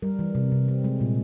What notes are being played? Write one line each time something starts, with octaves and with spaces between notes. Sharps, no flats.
G3 A#4
E3
C3
C3
C4
G#3
A#2